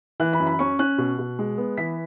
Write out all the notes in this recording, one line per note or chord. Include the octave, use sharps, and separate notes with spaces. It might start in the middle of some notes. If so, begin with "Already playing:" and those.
E3 F#6
B5
F#2
B5
C#4 C#6
C#4 F#6
B2
B2
G#3
B3
E3 B6